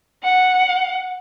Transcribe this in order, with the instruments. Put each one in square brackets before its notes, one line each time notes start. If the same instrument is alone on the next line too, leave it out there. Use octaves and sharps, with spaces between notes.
[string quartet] F#5